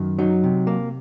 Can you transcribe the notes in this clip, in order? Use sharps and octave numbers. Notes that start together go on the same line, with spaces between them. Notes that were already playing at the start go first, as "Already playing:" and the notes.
Already playing: F#2 D#3
F#3 D#4
C3
A#3